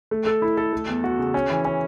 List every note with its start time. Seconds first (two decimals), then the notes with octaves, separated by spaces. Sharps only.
0.11 A3
0.26 A4
0.42 E4
0.57 A4
0.73 A3
0.88 E2
1.04 F#4
1.19 C#3
1.34 C#4
1.50 E3
1.65 C#4